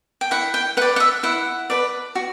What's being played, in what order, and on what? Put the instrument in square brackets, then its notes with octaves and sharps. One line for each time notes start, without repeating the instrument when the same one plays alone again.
[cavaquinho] G5
E4 F#5
G5
B4 F#5
D5
F#5
E5
E4 F#5
B4 D5
F#4